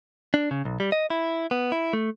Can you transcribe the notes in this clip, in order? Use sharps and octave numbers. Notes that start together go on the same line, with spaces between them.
D4
C#3
B1
G3
D#5
E4
B3
E4
A3